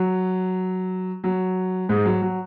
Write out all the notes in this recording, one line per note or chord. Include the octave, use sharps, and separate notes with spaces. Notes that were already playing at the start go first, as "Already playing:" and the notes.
Already playing: F#3
F#3
G#2 G#3
F#3
F#3